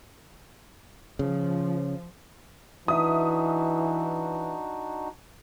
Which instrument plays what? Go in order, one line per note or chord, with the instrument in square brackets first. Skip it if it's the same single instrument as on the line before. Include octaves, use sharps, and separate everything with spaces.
[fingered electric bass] C#3 [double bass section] F3
[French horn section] E3 [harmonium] D4 D#4 F#4 [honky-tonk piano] E5 D#6